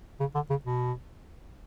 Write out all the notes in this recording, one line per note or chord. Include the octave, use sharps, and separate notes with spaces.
C#3
D3
C#3
B2